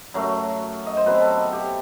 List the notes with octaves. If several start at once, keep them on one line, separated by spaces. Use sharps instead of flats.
F#2 F#3 A3
D#5
C5
B2 F#3 C4 B4
A4
G4